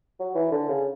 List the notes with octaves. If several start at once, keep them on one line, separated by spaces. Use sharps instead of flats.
F#3
E3
D3
C#3